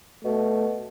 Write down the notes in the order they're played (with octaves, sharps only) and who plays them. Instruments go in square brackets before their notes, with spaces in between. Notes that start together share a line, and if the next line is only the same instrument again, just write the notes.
[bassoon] B2 [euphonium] A3